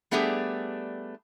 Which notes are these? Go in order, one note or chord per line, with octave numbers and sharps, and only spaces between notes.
G3 A3 B3 D4 G4 G#4